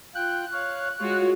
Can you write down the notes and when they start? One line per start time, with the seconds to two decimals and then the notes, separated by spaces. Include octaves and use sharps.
0.15 F4 G5 F#6
0.52 C#5 F5
0.99 G#3 F4 F#4 C#5